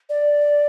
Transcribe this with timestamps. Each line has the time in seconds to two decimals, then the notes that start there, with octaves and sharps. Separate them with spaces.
0.09 D5